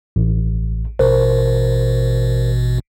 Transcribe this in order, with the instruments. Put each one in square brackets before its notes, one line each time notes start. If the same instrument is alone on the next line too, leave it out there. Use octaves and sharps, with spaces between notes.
[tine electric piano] A1
[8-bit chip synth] A1 B2 [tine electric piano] A#4 C5